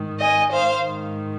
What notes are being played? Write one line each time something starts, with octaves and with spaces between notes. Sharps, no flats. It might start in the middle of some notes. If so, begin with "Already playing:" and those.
Already playing: G#2 D#3
D#5 G#5
C5 F5
G#2 D#3